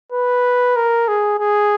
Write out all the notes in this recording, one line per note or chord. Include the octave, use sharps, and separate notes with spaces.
B4
A#4
G#4
G#4